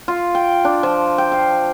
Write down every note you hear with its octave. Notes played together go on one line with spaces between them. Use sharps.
F4
G5
D4
F3
G5
F5